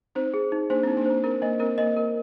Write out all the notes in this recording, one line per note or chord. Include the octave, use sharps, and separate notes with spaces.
C4 D#4 C5
G#4
D#4
A#3 D4 C5
C4
D#4
A#3 D4
C4 C5
C4 A#4
A#3 D#5
C4 A#4
A#3 D#5
A#4